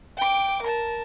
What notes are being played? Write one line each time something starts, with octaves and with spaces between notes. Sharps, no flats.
G5 D6
A#4 A5